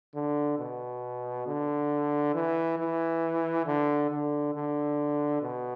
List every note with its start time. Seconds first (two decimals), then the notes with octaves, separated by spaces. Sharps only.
0.15 D3
0.59 B2
1.47 D3
2.34 E3
2.79 E3
3.66 D3
4.10 D3
4.54 D3
5.42 B2